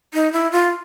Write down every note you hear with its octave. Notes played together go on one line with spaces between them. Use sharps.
D#4
E4
F4